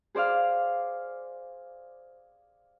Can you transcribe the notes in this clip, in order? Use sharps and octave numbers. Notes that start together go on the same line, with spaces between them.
G#4 C5 D5 F5 F6